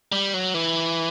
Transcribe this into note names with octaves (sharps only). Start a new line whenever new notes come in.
G3
F#3
E3